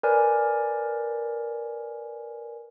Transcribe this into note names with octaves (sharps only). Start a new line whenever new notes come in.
A#4 B4 D5 G#5